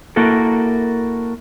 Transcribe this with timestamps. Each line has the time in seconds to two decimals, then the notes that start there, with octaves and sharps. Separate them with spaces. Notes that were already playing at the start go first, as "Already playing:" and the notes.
0.16 A#3 E4 F#4 A4 A#4